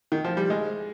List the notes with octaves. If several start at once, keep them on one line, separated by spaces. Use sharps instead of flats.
D#3
F3
G3
G#3